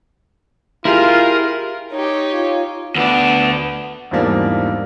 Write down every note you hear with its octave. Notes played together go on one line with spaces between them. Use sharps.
E4 F4 G4 G#4 A#4 A#5
D#4 G4 C#5
F4
D2 B3 D4
E2 G#2 F3 G3 A#3 D4